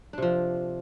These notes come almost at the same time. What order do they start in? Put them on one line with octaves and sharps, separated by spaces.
D4 C3 F3